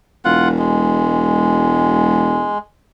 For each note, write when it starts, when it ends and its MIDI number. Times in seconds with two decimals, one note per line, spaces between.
0.25 2.55 28
0.25 0.48 65
0.25 0.48 78
0.58 2.58 56